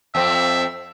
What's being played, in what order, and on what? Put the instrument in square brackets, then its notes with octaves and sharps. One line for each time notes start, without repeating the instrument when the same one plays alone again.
[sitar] F2 C4 [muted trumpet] E5